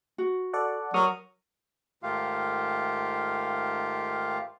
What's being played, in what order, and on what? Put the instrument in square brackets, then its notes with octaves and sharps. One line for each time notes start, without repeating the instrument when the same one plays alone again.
[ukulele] F#4
[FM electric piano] A4 D5 F#5
[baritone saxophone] F#3 [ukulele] A#4 [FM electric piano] C#6 D#6 F6
[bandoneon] G#2 D#3 A3 F4 G4 F5